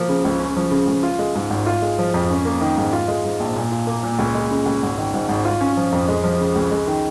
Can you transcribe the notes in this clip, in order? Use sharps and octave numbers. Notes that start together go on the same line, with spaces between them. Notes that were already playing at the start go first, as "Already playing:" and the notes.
Already playing: F3 A#3
C#3
C#2
C#4
F3
C#3
C#2
F4
G#3
G#2
G#1
F4
G#3
F3
F2
C#4
A#3
D#3
G#2
F4
G#3
G#2
A#1
A#2
F4
A#3
A#2
C#2
G#3
C#3
C#2
G#1
D#3
G#2
G#1
F4
C#4
F3
F2
G#3
F3
C#3
C#2
G#3
D#3